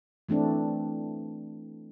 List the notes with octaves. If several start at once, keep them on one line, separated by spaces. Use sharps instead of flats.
E3 A3 C4 D4